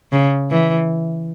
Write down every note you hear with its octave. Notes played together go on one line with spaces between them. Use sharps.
C#3
E3